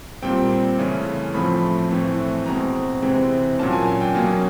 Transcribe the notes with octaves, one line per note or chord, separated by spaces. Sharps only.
A#2 G3 C4 G5
C#3 E3 A3 C#4
A2 F3 A3 C4 B5
A2 E3 A3 C4
B2 G#3 C4 A#5
C3 E3 G#3 C4
A#2 F#3 A#3 C#4 A5
G#5
G#5
G5
B2 F#3 A#3 C#4